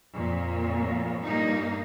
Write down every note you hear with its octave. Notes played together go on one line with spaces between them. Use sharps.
F2 A#2
G2 A#2 A#3 D#4